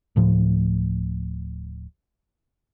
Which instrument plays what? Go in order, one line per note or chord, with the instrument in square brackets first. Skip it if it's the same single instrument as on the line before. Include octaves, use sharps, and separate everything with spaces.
[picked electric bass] D1 A2 F3